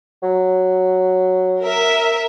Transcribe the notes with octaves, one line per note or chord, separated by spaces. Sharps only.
F#3
A#4 E5